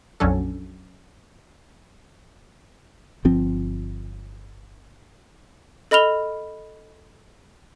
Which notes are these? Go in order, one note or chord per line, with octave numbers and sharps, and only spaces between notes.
A#1 F2 F#3 C#4 D4 A4
G1 F3 C4
A4 D#5 B5 F6 F7 G7